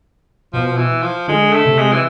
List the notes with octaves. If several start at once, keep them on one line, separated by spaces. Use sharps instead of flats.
B2 F3
E3
F3
D3 G#3
A3
C3
G#3
E3